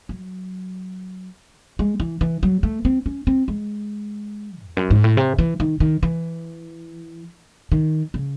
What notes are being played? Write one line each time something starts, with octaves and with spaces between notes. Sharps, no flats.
F#3
G#3
E3
E3
F#3
A3
C4
C#4
C4
G#3
E2
F#2
G#2
A2
C3
E3
D#3
D#3
E3
D#3
C#3